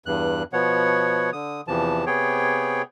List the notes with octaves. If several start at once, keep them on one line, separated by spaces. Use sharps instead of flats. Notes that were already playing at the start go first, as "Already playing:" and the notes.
E2 G2 F#6
B2 F3 B3 C#5 F#5
D3 D#6
E2 C3 E3 F3 A5
C3 B3 G#4 C#5 G5